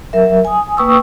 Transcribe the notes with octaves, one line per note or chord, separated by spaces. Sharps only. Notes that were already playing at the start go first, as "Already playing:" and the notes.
F#3 A#4 E5
G#5 D#6
A#3 B4 G5 C#6 D#6 E6